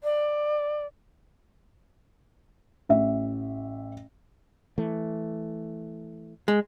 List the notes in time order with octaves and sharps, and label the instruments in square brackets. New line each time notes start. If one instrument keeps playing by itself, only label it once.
[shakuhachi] D5
[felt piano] A1 E5
[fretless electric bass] E3 A3
[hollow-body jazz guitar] G#3